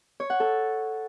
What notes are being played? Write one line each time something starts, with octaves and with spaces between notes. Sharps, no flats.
C#5
F#5
A4